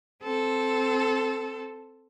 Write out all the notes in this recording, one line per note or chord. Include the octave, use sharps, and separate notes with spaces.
C4 A4